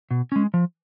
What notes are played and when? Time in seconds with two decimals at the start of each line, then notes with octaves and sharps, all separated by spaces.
0.11 B2
0.32 G#3 C#4
0.54 F3